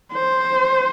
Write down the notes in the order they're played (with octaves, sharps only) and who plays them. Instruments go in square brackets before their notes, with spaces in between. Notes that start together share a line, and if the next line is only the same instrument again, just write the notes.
[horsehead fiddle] C5